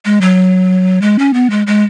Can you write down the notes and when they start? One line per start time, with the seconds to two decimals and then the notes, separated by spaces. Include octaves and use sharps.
0.05 G#3
0.21 F#3
1.02 G#3
1.19 C#4
1.34 B3
1.50 G#3
1.67 G#3